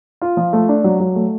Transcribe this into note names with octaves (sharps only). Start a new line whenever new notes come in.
F4
F3
A3
D4
F#3
F#3
A3